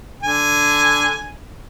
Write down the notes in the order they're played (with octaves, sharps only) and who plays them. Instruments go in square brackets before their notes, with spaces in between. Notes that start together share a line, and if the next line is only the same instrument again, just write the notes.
[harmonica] D3 G#5